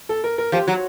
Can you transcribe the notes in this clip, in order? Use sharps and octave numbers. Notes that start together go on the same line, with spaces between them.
A4
A#4
A#4
F3 G4
F#3 F#4